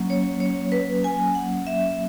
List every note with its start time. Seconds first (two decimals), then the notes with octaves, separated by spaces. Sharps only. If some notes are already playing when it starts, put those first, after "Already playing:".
Already playing: F#3 A#3 C#4
0.10 C#5
0.40 C#5
0.72 B4
1.04 G#5
1.35 F#5
1.67 E5